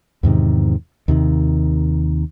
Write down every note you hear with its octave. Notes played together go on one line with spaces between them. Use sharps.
E2 G#2 C3 D#3
D#2 C3 D#3